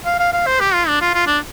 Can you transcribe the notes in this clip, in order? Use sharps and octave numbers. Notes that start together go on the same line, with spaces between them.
F5
F5
F5
C5
G4
F4
D4
F4
F4
D4